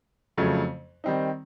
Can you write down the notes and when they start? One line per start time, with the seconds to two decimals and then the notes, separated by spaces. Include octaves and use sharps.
0.37 F2 C#3 F#3 A3
1.04 D#3 G3 C4 D#4